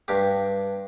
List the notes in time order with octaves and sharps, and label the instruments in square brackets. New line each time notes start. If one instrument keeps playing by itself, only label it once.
[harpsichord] G2 G4